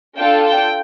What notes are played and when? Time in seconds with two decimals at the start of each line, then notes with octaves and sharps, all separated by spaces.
0.16 D4 F4 A4 G5
0.46 G5